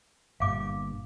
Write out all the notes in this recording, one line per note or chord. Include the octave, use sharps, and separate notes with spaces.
G1 G2 A#2 F5 D6